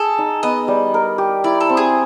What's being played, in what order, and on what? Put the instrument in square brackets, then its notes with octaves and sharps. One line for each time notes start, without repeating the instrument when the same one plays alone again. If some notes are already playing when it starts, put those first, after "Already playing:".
Already playing: [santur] G#4 [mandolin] A4
[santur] D#4
[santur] B3 [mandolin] D#5
[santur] G3
A#4
G4
[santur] E4 [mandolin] D5
[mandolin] A4
[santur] C4
[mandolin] G#4